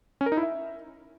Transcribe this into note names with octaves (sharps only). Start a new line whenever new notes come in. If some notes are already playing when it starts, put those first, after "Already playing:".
C#4
A#4
D#4
E4
E5